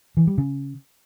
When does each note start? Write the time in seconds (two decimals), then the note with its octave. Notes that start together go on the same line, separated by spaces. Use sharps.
0.17 E3
0.27 G3
0.38 C#3